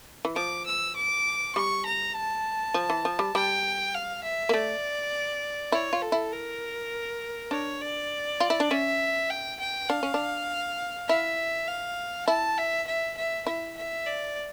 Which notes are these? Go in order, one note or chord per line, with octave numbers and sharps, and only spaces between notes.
E3
F3 D6
E6
D6
G3 C#6
A#5
A5
F3
E3
F3
G3
G3 G5
F5
E5
A#3
A3 D5
E4 C#5
F4
A4
E4
A#4
D4 C#5
D5
F4
E4
D4
C#4 E5
G5
G5
D4 F5
C#4
D4
E4 E5
F5
E4 A5
E5
E5
E5
E4 E5
E5
D5